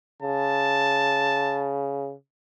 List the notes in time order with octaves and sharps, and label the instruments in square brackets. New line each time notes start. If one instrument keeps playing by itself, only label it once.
[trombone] C#3 [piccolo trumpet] A5